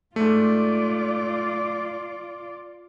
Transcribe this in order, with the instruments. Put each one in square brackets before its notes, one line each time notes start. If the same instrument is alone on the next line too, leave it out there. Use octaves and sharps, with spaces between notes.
[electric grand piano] G#2 A3 [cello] F4 D5